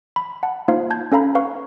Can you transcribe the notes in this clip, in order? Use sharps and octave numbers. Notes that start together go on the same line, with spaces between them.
B5
F#5 A5
A#3 D#4 F4 C5 F5
A5 G6 G#6
C#4 A4 F5 A#5 B5
B4 F5 C#6